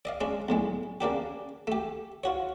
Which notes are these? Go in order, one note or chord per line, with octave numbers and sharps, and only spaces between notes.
D5 D#5 F5
G#3 C#4 D4
B1 A2 G#3
C#3 A#3 D4 G4
A3 G4
F4 F#4 C#5